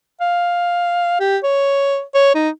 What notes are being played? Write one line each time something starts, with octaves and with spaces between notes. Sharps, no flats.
F5
G4
C#5
C#5
D#4